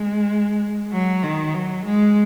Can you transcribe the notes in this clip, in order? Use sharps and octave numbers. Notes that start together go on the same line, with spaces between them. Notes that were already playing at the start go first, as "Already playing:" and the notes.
Already playing: G#3
F#3
D#3
F#3
G#3